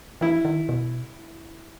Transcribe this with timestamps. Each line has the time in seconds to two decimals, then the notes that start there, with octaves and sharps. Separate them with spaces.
0.21 E3 E4
0.45 D#3
0.69 B2